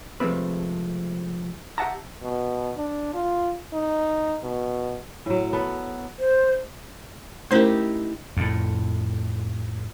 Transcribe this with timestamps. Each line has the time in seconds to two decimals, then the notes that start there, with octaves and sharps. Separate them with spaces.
0.20 C3 F3 G#3 A3 C4 B4
1.78 G4 E5 F#5 A5 A#5
2.23 B2
2.77 D4
3.14 F4
3.74 D#4
4.43 B2
5.26 A2 F#3
5.53 B3 A4 B4
6.19 C5
7.51 A3 C#4 D#4 E4 G4 A#4 C5 C6
8.37 F2 A2